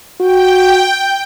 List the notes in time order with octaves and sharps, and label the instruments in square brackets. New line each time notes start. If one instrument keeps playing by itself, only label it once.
[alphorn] F#4 [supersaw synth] G5